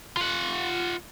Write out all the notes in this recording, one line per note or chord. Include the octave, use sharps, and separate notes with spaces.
F4 F#5